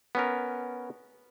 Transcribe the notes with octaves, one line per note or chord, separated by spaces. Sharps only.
B3 C#4 A#4